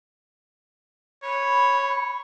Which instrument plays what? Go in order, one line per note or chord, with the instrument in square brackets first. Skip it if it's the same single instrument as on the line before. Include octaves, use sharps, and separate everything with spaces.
[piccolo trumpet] C#5 [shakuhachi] B5